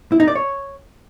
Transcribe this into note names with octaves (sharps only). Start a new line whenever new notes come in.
E4
D#4
D5
C#5